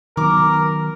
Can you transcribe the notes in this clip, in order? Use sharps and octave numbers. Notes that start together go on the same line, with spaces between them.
D#3 F#3 B3 A#4 D6